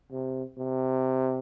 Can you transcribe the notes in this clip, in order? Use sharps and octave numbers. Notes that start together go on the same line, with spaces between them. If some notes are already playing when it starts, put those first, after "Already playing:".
C3
C3